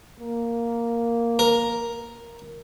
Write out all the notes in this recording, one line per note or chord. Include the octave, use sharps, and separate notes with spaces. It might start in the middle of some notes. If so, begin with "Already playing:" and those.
A#3
A#4